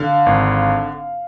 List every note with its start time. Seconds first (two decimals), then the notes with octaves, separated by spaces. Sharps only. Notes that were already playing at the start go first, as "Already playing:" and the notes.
Already playing: D3 F5
0.26 G#1